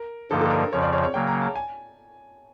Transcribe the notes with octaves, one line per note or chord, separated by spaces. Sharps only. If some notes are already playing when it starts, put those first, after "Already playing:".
Already playing: A#4
G2 D3 F3 A#3 D#4 A4
A4
A#4
F2 C#3 F3 C#5
D5
C#5
C#5
C#3 F#3 A#3 G5
A#5
A5
G#5